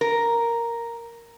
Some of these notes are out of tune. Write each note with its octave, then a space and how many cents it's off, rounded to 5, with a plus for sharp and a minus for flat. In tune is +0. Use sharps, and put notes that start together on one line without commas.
A#4 +0